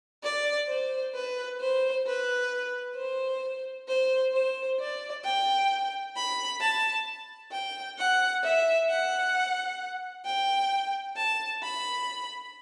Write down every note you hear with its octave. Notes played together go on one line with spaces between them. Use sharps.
D5
C5
B4
C5
B4
C5
C5
C5
D5
G5
B5
A5
G5
F#5
E5
F#5
G5
A5
B5